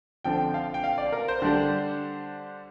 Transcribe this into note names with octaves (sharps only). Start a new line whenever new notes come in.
D3 F3 C4 G5
F5
G5
F5
D5
A#4
C5
D3 G3 D4